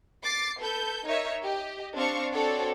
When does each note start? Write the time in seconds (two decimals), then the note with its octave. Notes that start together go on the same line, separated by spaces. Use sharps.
0.24 D6 A6 C7
0.60 A4 B4 G6
1.06 D#4 A#4 C#5 E5
1.43 G4 D#5
1.95 C4 D4 F5 C#6
2.32 C4 D4 F#4 A4 C#5 D5